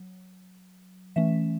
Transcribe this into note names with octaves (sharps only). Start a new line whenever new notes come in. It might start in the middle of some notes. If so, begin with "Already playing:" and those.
Already playing: F#3
E3 A3 C#4 E5